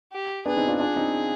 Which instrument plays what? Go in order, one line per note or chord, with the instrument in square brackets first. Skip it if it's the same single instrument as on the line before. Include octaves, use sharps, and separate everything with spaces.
[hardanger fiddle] G4
[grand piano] B3 D4 [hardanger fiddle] G#4
[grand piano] C4 D#4
D4 F4
[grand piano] D4 F4 [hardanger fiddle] G#4
[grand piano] C4 D#4